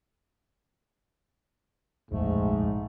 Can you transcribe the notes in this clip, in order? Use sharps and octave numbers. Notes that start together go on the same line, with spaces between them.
D#1 A#1 F2 G#2 A3